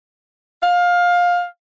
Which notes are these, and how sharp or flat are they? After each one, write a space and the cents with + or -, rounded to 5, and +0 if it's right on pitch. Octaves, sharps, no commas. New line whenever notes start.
F5 +20